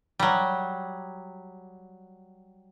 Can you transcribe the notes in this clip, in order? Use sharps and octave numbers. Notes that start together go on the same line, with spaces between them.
F#3 G3